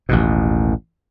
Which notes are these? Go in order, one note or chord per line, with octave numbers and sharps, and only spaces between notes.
A1 D#2 B2